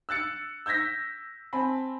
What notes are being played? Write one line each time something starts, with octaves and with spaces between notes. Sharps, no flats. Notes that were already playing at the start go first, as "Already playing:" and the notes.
E6 F#6 A6 C#7
E6 G6 G#6 A#6 B6
C4 G#5 A5 B5